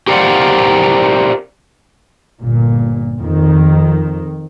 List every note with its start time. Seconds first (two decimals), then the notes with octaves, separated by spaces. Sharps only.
0.08 G4 A#4 C5 D5 F5 F#5
2.42 G1 A#2
3.19 F2 D#3